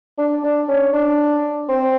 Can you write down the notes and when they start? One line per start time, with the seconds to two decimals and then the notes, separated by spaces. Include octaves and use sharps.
0.18 D4
0.43 D4
0.68 C#4
0.93 D4
1.68 C4